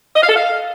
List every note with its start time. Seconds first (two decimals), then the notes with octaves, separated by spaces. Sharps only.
0.16 D#5
0.22 F5
0.29 A4
0.36 F5